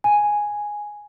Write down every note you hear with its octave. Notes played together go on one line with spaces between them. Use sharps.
G#5